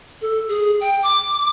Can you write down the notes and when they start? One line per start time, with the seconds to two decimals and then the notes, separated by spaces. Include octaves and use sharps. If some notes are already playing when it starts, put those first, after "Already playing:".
0.22 A4
0.48 G#4
0.80 G5
1.03 D6